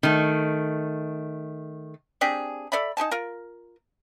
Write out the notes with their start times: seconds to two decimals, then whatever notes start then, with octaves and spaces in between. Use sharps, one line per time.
0.03 D#3 A3
2.21 C4 D4 G4 G#4
2.72 A4 D5 E5 B5
2.97 D#4 G4 G#5 A5
3.11 F4 A#4